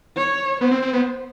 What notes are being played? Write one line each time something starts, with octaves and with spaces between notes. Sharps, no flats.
C#5
B3 C5
C4
C4
B3